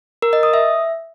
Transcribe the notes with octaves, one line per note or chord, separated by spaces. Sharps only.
A#4
D#5
D#6
E5